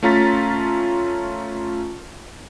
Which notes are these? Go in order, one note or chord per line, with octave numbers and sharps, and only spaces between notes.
A3 C#4 F4 A#5 A6 B6